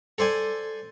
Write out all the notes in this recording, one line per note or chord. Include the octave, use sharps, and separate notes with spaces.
A4 C5 D5 G#5